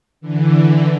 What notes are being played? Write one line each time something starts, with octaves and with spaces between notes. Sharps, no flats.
D3 E3